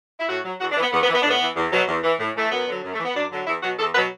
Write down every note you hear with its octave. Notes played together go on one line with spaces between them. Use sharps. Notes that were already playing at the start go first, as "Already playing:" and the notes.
E4
A2 F#4
F#3
E2 F#4
D4
E3
B3
E2 B3
B3
E3
B3
A2 D4
B3
E3
E2
B2 F#3
E2
E3
A2
E3 A3
F#2 B3
D3 F#3
F#2
A3
E3
B3
F#2 D4
D3 F#3
E2 E4
B2 F#3 F#4
E2 A4
B2 F#3 B4